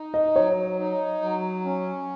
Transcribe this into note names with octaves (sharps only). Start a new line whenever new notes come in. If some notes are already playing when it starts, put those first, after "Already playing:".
Already playing: D#4
D#5
F#3 C#5
D#4
F#3
C#4